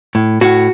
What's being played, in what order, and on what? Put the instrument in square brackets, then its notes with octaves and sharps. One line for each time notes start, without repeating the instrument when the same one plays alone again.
[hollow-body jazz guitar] A2
A2 F#4